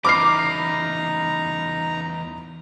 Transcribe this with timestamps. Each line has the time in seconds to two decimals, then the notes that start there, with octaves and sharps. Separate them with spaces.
0.05 E2 C#3 D#4 A#5 B5 D6 F6 C7